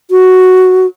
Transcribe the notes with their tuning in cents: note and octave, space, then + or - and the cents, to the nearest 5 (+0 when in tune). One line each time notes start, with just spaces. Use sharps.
F#4 +0